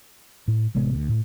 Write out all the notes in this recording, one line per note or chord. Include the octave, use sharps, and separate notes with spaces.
A2
A1 C3 G#3 B3
D2
A2